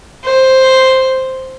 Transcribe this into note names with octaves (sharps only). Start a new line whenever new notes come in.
C5